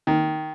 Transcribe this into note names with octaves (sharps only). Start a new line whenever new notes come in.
D#3